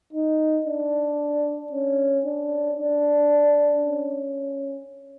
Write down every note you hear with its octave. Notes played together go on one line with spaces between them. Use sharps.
D#4
D4
C#4
D4
D4
C#4